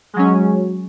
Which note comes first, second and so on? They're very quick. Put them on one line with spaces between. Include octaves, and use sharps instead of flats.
G#3 F#3 C#4